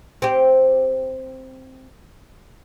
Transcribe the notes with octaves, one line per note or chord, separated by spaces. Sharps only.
C4 G4